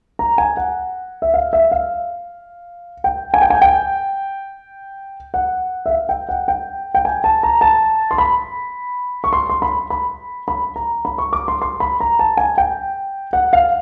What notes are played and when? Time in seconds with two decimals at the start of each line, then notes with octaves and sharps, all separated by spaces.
0.19 A#5
0.38 G#5
0.57 F#5
1.22 E5
1.34 F5
1.53 E5
1.71 F5
3.04 G5
3.34 G#5
3.42 G5
3.50 G#5
3.62 G5
5.34 F#5
5.86 E5
5.90 F5
6.09 G5
6.29 F#5
6.48 G5
6.95 G5
7.05 G#5
7.24 A5
7.43 A#5
7.61 A5
8.11 C6
8.18 B5
9.24 C#6
9.33 C6
9.50 C6
9.62 B5
9.90 B5
10.48 B5
10.76 A#5
11.05 B5
11.18 C#6
11.33 D6
11.48 C6
11.62 C6
11.80 B5
12.00 A#5
12.19 A5
12.37 G#5
12.58 G5
13.33 F#5
13.53 F5